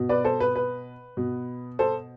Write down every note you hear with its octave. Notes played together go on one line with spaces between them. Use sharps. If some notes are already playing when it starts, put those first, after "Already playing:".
Already playing: B2
B4 D5
A4 C5
B4
B4
B2
A4 C5